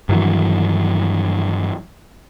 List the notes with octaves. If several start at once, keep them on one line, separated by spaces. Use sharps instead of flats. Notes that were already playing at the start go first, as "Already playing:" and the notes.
G2 D#3 E3 F#3